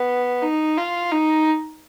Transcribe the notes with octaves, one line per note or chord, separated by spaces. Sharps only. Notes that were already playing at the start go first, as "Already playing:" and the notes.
Already playing: B3
D#4
F4
D#4